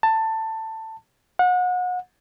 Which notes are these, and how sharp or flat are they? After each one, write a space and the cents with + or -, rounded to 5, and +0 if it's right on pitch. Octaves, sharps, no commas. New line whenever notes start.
A5 +15
F#5 -35